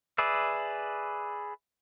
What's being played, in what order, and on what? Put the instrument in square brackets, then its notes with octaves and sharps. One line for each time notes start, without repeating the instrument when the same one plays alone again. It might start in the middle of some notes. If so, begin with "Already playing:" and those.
[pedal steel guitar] G#4 B4 D5 E5